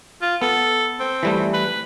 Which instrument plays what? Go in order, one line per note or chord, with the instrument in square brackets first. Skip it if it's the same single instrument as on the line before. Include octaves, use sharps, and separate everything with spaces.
[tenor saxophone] F4
[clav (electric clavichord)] B3 [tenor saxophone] A4
[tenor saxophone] C4
[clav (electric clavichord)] E3 G3 A3
[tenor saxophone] B4